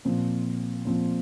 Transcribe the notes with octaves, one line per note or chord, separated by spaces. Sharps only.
A#2 F3 C4
A#2 F3 C4